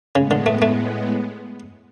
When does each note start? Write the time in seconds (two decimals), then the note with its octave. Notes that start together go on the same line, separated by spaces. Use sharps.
0.15 A2 C#3 G#3 B3
0.31 D3
0.46 A3
0.62 A3